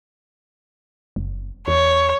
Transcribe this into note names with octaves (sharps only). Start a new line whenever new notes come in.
F#1
E2 C#5